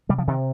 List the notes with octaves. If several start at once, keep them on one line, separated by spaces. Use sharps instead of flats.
C3 G3
F3
C3 D#3